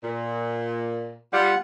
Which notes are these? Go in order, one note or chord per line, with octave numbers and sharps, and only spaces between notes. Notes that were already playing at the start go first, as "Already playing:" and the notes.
A#2
G3 F4 F#5